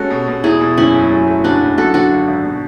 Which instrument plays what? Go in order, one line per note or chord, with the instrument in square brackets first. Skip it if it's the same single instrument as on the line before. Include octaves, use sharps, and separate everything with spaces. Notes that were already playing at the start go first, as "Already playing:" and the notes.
Already playing: [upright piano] G#3 C#4 [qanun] F#4 A4
[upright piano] B2
B2
[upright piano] E2 [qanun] E4 G#4
[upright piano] B2
[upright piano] F#1 [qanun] C#4 E4
[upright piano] F#1
F#3
A3
[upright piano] C#3 [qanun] D4 F#4
[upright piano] C#3
[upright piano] F#2 [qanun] F#4 A4
[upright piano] D3 [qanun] D4 F#4
[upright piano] G#1
G#1
B2